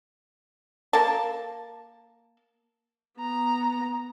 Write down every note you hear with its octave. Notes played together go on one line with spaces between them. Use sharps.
A#3 A5
B3 A#5